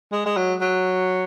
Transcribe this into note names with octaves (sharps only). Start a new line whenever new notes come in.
G#3
G#3
F#3
F#3